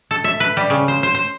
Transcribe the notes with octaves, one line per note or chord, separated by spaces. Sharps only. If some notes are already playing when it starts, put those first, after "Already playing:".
A4
E5
B4
G3
C#3
C5
C5
C5